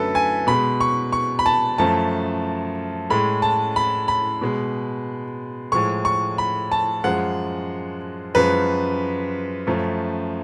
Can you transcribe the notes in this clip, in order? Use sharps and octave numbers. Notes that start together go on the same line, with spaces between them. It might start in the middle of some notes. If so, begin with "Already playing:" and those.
Already playing: F#2 D3 F#3 A3 A4 B4
G#5
B2 G#3 B5
C#6
C#6
B5
A5
F#2 F3 A3 A5
A2 G#3 B5
A5
B5
B5
B2 G#3
A2 F3 G#3 C#6
C#6
B5
A5
F#2 F3 G#3 F#5
F#2 F3 G#3 B4
F#2 F3 A3